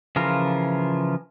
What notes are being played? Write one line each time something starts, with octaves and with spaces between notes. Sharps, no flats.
C#3 E3 F3 F4 A#4